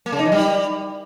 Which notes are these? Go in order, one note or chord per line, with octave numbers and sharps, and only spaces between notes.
A#3
C#3
D#4
E3
G3